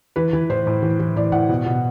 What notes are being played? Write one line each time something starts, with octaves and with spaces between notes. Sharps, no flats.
E3 B4
E3
A2 C5
A2
E3
E3
A2 D5
A2 F#5
B2
B2